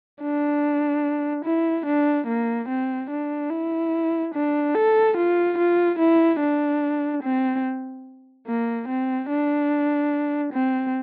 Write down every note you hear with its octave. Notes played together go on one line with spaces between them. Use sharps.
D4
E4
D4
A#3
C4
D4
E4
D4
A4
F4
F4
E4
D4
C4
A#3
C4
D4
C4